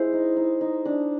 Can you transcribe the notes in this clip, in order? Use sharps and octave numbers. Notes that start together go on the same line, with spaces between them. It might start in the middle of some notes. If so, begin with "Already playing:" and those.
Already playing: G#3 E4 C5
D#4
D#4
D#4
D4